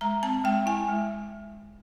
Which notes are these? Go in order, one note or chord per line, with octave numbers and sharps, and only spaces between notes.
G#3 A#5
C4 A5
G#3 G5
E4 G#5
G#3